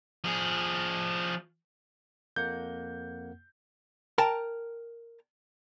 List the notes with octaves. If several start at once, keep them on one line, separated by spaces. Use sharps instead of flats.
F3 G#4
F2 A#3 F#5 G6
A#4 G5 A5 A#5